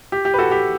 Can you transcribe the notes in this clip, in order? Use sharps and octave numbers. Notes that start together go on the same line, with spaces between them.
G4
G4
B4
F#4 A4
G4